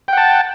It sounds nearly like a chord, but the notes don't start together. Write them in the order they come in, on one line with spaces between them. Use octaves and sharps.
G5 F#5 A5